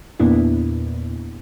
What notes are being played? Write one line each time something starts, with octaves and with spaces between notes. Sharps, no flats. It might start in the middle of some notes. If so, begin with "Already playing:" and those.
E2 A#2 A#3 B3 D4 E4